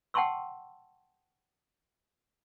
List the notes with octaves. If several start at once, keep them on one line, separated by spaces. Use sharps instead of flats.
F#5 G5 A5 C6 C#6 E6